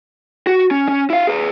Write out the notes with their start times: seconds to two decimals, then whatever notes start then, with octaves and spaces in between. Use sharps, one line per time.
0.47 F#4
0.71 C#4
0.88 C#4
1.10 E4 F5
1.27 G#4 B4